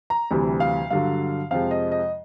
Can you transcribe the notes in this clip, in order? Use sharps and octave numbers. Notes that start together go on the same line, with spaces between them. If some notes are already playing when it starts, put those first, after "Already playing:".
A#5
D2 C3 E3 G3
F5
G2 D3 F#3 F5
F2 C3 F3 G#3 F5
D#5
D#5